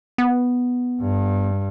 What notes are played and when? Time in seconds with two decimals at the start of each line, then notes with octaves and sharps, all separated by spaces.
0.18 B3
1.02 G2